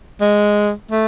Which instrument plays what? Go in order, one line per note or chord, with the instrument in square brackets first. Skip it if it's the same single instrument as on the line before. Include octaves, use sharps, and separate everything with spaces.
[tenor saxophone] G#3
A3